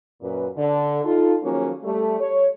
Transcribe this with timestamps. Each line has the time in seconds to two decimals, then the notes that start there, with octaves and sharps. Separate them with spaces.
0.21 F#2 A#2 B4
0.55 D3
1.03 D#4 F4 A4
1.42 D#3 F3 F#3 A#3 C#4 G#4
1.83 G3 A3
2.20 C#5